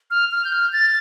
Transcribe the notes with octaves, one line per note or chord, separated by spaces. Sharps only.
F6
F6
G6
F6
A6